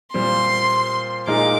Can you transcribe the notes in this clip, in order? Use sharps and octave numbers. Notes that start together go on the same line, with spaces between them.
A#2 G3 C4 C6
A#2 G#3 D#4 A#4 D6